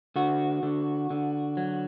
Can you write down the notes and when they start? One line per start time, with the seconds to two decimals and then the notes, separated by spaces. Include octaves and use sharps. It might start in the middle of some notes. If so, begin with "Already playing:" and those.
0.16 D3 F#4
0.63 D3
1.10 D3
1.57 F#3